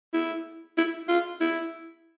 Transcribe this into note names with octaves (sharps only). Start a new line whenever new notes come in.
E4
E4
F4
E4